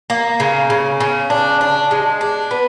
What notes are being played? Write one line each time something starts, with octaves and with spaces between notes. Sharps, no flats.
A#3
C#3
C#3
C#3
D4
D4
G#3
D4
B3